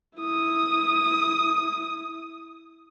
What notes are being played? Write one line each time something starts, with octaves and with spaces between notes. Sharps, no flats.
E4 D#6